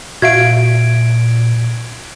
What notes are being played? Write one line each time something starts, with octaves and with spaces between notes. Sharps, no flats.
A#2 F#4 E5 F5 G#6 D7